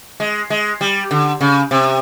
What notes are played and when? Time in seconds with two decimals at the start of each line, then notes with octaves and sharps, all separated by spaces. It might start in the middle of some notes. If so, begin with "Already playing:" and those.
0.20 G#3
0.50 G#3
0.81 G3
1.11 D3
1.41 C#3
1.71 C3